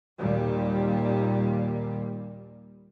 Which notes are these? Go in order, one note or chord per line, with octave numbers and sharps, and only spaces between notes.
D#2 A#2 G3